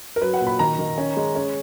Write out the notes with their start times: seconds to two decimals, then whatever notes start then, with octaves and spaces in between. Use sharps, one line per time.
0.16 A#4
0.21 F#3 B4
0.34 F#5
0.40 A#2
0.47 B5
0.59 D#3 A#5
0.79 D#3
0.98 C#4
1.17 G#3
1.35 C#4